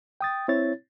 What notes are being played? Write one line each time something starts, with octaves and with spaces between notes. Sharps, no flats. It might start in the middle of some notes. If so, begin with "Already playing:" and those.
G5 D#6 A6
C4 E4 C#5 A6